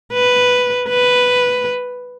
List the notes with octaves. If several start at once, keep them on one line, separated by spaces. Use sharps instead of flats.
B4
B4